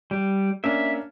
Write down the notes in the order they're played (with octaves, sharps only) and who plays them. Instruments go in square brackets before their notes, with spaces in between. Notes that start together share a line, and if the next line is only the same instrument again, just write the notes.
[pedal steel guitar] G3
[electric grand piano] A#3 C#4 D4 [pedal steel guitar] E5